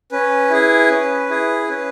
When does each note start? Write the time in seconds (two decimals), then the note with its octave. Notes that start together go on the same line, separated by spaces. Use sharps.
0.12 C#4 B4
0.50 E4 G#4
0.90 C#4
1.29 E4 G#4
1.69 C#4 B4